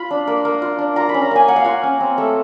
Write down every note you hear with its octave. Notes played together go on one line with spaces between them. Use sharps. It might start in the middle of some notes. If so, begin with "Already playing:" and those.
Already playing: F4 B5
D4
A#3
A#3
F4
D4
F4 A#5
B5
C#4
A#5
A#3 G#5
A#3 F#5
F5
F4 F#5
C#4
C4
A3